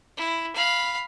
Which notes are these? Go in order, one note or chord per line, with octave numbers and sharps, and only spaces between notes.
E4
F5 B5